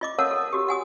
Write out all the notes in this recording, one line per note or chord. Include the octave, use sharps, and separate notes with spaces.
F4 D#5 D6
A4 A#4 C#5 F5 F#5 A5
A4
F#4 G4
F#5 G#5 D#6